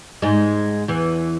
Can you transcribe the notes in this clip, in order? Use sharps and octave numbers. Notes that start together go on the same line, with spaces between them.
G#2 G#3
E2 E3